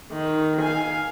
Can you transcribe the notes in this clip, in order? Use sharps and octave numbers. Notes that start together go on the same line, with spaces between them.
D#3
F5 G#5